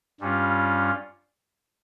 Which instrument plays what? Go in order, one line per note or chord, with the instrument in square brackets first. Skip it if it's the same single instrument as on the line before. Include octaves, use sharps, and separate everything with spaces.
[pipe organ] G2 G3 C#4 F4